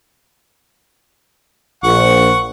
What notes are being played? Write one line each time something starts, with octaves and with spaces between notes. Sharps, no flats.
A#1 F#5 C#6